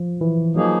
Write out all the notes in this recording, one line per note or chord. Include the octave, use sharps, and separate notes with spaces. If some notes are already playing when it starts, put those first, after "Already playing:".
Already playing: F3
E3
F3 F#3 A#3 D#4 G#4